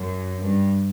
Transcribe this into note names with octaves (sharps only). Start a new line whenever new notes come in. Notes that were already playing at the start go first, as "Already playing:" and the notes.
Already playing: F#2
G2